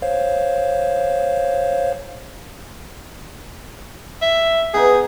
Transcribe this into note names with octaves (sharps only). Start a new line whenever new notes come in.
C5 C#5 F5
E5
B3 D#4 G#4